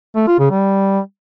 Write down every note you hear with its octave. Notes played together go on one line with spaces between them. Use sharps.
A3
F4
C#3
G3